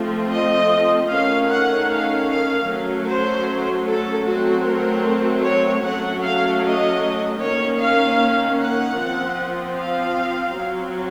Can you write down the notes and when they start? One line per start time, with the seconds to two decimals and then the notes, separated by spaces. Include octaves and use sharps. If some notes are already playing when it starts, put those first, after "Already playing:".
Already playing: F3 A3 C4
0.32 D#5
1.10 D#3 A3 C#4 F5
1.50 F#5
1.90 F5
2.29 F5
2.68 F#3 A3 C#4
3.08 C5
3.86 A4
4.26 F#3 A3 C4 F#4
4.66 A#4
5.43 C#5
5.83 F#3 A3 C#4 F#5
6.23 F5
6.63 D#5
7.40 D#3 A#3 C#4 C#5
7.80 F5
8.59 F#5
8.99 F3 C4
9.78 F5
10.56 F#3 C4